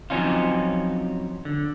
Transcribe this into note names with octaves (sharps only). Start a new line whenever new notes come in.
F3 F#3 C4 C#4 D#4 F4
D3